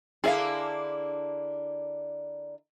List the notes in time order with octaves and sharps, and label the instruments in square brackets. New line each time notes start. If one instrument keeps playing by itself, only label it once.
[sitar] D3 A#3 E4 [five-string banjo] G#4 E5 F5